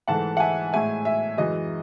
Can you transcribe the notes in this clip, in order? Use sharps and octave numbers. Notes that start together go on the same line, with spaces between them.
G#2 E3 A3 F#5 A5
F#5
E5 G#5
A2 G#3 E5 G#5
E5
F#2 E3 G#3 D#5